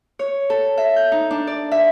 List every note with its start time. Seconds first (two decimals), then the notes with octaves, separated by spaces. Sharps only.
0.19 C#5
0.50 A4
0.77 E5
0.96 G6
1.12 D#4
1.31 D4
1.47 D5
1.72 E5